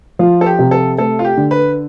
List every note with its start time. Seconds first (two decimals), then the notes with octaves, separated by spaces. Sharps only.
0.19 F3 F4
0.41 A4
0.46 G4
0.59 C3
0.71 A4
0.98 A3 A4
1.19 F4
1.24 G4
1.37 D3
1.51 B4